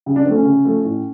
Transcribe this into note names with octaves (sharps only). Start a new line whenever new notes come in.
C#3
D4
F3 A3 C4
C#4
C#3
F3 A3
A2